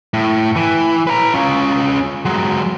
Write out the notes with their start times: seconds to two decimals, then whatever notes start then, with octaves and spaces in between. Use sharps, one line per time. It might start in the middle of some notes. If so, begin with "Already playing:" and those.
0.14 A2
0.56 E3
1.07 B4 A#5
1.34 C#4 F4
2.25 F#3 G#3